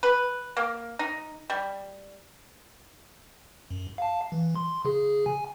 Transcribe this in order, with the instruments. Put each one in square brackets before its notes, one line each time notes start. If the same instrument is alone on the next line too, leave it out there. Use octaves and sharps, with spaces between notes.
[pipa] B4
A#3
D#4
G3
[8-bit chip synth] F#2
F5 A5
E3
C6
C#3 G#4
G#5